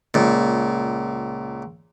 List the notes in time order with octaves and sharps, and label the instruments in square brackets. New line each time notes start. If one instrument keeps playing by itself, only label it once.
[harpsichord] C#2 A#2